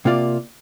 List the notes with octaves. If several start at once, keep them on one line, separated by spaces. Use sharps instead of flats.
C3 A#3 F4 D5